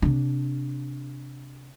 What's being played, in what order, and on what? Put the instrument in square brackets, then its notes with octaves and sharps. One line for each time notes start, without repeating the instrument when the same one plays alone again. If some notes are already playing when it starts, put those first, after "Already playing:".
[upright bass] C3 D4